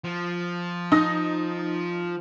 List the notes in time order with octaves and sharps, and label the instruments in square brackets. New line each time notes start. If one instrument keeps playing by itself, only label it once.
[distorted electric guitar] F3
[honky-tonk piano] D#4 D#6 A#6